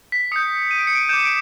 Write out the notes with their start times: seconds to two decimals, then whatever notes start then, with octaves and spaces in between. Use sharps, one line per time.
0.12 B6
0.32 D#6 G6 C#7
0.71 D#7
0.79 D7
0.87 C#7
0.95 D7
1.09 D6 G6 E7
1.25 D7